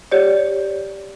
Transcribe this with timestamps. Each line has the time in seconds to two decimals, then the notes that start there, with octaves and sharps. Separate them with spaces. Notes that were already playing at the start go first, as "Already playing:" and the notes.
0.12 G4 C#5 D5